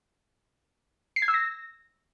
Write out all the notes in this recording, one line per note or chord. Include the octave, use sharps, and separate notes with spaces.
C7
G#6
E6
A#6